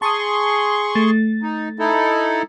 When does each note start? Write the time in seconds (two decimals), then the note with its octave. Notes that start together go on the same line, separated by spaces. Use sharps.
0.02 G#4 A5 C6 C#6 D#6
0.95 A3 A6
1.42 D#4
1.79 D#4 E4 A4